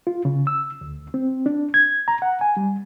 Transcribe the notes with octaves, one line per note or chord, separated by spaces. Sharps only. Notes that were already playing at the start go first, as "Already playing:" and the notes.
F4
C#3
E6
D2
C4
D4
G#6
A#5
F#5
G#5
G3